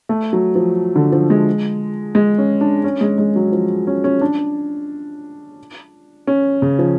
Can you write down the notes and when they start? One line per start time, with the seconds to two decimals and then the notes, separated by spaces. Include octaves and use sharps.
0.09 A3
0.33 F#3
0.55 F3
0.96 D3
1.12 F3
1.30 G#3
2.15 G#3
2.38 C#4
2.61 D4
2.84 C#4
3.01 G#3
3.18 G#3
3.36 F#3
3.52 F3
3.87 C#4
4.04 C#4
4.21 D4
6.27 C#4
6.62 C#3
6.79 F3